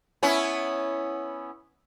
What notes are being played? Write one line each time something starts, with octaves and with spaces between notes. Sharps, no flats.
B3 C#4 E4